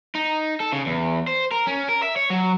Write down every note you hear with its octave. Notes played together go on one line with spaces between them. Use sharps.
D#4
A4
C#3
E2
C5
A#4
C#4
A#4
E5
C#5
F#3